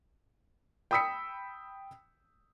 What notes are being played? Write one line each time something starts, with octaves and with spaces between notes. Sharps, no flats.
G5 B5 D#6 E6 B6 C#7